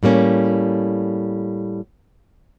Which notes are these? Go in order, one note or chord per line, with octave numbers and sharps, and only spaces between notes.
A2 G3 A#3 C#4